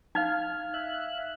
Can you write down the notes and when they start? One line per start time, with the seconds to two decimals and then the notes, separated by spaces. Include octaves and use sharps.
0.15 D#4 F5 F6 G#6
0.74 E5 F#6